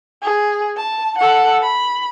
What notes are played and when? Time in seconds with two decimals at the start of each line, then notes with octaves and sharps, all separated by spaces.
0.22 G#4
0.77 A5
1.18 A4 F#5
1.62 B5